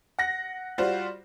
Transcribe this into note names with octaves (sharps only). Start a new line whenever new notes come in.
F#5 A#6
G3 F4 F#4 C5